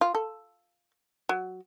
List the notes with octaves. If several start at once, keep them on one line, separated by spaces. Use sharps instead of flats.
F4
A4
F#3